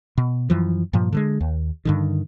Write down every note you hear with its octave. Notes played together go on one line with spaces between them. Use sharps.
B2
F#2 E3 F3
G2 A#2 F3
D3 G3 G#3
D#2
G2 D3 D#3